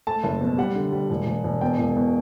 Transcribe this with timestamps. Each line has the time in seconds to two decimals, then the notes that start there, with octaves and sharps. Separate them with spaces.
0.07 A3 A5
0.24 F#1
0.41 B2
0.58 G3 F#5
0.75 D3
0.92 G3
1.10 E1
1.26 E1
1.44 E1
1.61 B2 G5
1.79 E1
1.97 B2